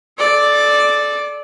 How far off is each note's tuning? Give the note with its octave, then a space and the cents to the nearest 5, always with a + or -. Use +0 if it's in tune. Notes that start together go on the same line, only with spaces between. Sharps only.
A4 -30 D5 +0